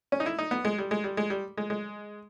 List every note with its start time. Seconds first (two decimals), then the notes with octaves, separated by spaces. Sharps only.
0.12 C#4
0.20 D#4
0.26 E4
0.39 D#4
0.51 B3
0.65 G#3
0.78 G3
0.91 G#3
1.04 G3
1.17 G#3
1.30 G3
1.57 G#3
1.70 G#3